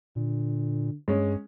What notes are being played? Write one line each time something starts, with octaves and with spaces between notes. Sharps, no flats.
A#2 D3
G2 G#3 C#4